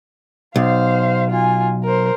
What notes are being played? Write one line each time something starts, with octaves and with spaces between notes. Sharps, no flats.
B1 C5 F5
F4 G#5
A#4 C5